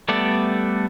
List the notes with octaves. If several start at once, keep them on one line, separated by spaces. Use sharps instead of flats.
G3 A3 B3 A4 D5